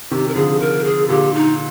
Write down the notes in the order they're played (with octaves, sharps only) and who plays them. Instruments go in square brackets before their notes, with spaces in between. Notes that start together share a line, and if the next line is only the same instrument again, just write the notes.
[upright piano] C3 D#3 [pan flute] G4
[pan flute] A#4
[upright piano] D3 F3 [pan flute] G#4
[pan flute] A#4
G#4
[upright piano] A#2 D3 [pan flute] G4
[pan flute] D#4